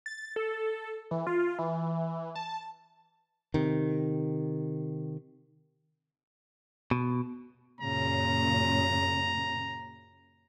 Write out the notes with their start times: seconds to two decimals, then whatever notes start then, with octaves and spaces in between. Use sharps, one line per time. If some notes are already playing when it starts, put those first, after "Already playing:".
0.06 A6
0.36 A4
1.11 E3
1.27 F4
1.59 E3
2.36 A5
3.54 C3 D#3
6.91 B2
7.81 F#2 A#2 C#3 A#5